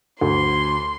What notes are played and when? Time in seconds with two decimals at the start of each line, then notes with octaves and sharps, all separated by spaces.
0.21 D2 C6